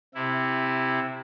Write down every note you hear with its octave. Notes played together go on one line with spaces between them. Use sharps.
C3 E4